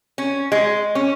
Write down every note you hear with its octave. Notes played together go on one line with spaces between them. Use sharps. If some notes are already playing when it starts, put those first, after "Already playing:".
C#4
G#3
C#4